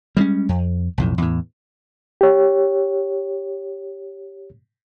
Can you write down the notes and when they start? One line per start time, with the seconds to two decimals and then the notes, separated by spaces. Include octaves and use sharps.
0.17 G3 G#3 A#3 C#4
0.49 F2
0.98 B1 F2 A2
1.18 E2 A2
2.21 G4 C#5